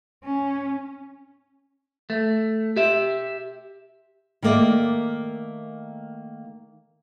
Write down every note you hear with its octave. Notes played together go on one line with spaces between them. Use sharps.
C#4
A3
G4 E5
D#3 A3 A#3 D5 D#5